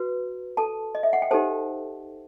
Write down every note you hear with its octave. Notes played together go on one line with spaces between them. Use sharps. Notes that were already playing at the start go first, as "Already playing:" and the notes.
Already playing: F#4 B4
A4 A5
D#5
E5
F#5
G5
D#4 G4 A4 C5 A5